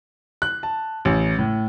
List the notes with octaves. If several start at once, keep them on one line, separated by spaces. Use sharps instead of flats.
F#6
A5
A1
A2